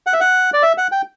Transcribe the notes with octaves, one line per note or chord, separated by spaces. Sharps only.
F#5
E5
F#5
D5
E5
F#5
G5